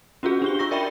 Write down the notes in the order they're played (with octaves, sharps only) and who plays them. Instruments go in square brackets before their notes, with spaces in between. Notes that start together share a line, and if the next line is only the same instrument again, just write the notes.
[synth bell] C#4 F4 F#4 G#4
D4 G4 G7
F4 C#6 A#6
A#4 D5 E5 G5 B5